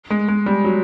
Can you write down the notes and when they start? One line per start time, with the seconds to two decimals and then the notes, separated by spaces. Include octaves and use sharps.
0.10 G#3
0.28 G#3
0.46 G3
0.64 F#3